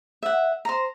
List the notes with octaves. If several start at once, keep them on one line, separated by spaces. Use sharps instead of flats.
E5 F#5
C5 A#5